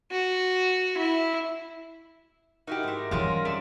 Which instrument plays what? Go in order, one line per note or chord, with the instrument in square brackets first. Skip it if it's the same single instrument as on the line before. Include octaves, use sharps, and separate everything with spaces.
[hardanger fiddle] F#4
E4
[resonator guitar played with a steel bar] D#4 E4 G4 [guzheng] F#4 [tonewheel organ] A#4
[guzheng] G#2 E5
[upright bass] E3 G3 [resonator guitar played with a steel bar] G#3 [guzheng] C#4 D#4 F4
[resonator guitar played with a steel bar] F#2 C4 D5 [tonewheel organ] E5